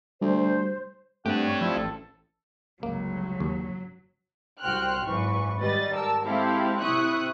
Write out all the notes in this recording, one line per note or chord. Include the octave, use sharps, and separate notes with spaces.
D2 G3 C5
G2 A3 C4 D4 G4 F#5
C#5
F3 E4
A1 A4
F1 C#2 G2 F#3 A#3
D#2
C2 F#4 C5 G5 F6 F#6
G#1 F#2 E3 B4 C#6
G#1 G3 B4 D#5 A6
A#4 A5 E6
G#3 C4 E4 G4 A4 F5
C3 E4 E5 C#6 D#6 F#6